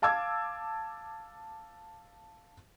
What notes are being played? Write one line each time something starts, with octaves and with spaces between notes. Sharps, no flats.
F5 A5 D6 E6 G#6